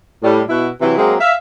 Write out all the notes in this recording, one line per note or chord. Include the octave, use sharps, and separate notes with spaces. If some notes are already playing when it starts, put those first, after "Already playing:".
A2 G3
B2 E4 F#4 B4
C3 E3 F#3 E4
F#3 G#3 A#3 C4
E5 F5